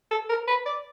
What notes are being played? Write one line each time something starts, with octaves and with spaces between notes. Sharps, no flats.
A4
A#4
B4
D5